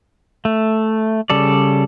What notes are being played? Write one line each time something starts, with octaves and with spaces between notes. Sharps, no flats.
A3
C#3 G3 A4 D5